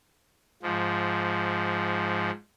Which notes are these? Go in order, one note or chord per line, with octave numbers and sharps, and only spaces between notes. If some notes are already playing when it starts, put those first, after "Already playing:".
G#2 F3